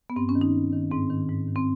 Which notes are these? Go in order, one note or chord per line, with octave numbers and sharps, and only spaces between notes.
B3
G2 C4
C#4
D#3
D#4
G2
D#3
G#2 C4
D#3
G#2
D#3
C4